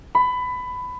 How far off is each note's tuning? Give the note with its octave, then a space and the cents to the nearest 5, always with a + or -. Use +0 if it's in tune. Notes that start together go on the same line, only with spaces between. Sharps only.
B5 +20